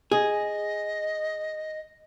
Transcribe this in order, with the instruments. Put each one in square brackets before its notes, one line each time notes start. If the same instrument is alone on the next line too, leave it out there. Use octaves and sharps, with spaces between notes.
[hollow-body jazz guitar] G#4 [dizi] D#5